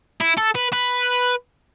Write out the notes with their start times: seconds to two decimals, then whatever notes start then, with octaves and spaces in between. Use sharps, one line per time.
0.21 E4
0.38 A4
0.55 B4
0.73 B4